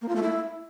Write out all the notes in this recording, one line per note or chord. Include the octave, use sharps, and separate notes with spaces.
A#3
F4
A3
E4